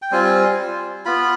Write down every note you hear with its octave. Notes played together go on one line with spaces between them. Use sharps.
G5
G3 C4 F4 G#5
B3 F4 B5